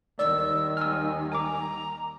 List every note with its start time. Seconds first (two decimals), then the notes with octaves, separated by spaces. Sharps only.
0.19 D#2 D#3 G3 D5 E6
0.77 G#5 E6 F6
1.32 G#5 A#5 D6